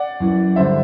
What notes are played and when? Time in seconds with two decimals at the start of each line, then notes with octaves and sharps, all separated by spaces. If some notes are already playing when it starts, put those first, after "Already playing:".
Already playing: D5 F#5
0.20 F#2 E3
0.56 G2 D3 C5 E5